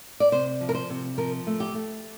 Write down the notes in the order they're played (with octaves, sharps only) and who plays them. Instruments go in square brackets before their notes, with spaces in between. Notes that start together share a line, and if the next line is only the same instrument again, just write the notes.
[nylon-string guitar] D5
C3 C5
F3
A#4
C5
C3
F3 A#4
A3
G4
A3